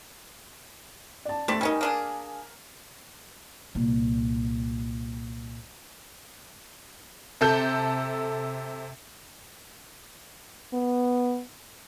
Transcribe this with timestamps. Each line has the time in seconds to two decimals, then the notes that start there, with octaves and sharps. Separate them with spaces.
1.25 D5 A5
1.48 G3 A3 C4 D5 B6 E7
1.61 G3 C#4 D#4 A#4 G#5
1.81 A#3 D4 G#4
3.75 C2 A#2
7.41 C3 A4 G6
10.73 B3